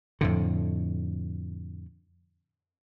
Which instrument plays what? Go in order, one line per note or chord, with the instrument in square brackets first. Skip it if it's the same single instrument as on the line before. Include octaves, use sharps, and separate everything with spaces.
[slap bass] F2 A2 D3